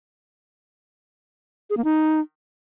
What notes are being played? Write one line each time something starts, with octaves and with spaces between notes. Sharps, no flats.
G#4
A#3
D#4